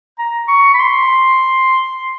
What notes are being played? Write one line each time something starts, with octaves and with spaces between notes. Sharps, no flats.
A#5
C#6
B5
C6